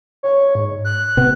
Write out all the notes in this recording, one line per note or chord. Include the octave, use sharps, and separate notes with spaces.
C#5
G#2
F#6
C3 B3